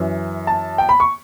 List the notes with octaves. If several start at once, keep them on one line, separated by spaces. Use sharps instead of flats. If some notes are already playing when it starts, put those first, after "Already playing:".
Already playing: F#2 E3
A5
G5
B5
C#6